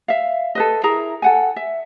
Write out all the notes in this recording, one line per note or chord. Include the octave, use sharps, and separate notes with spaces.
E5 F5
A4 B4 D#5
E4 G#4 A#4 A#5
A4 F#5 G#5
E5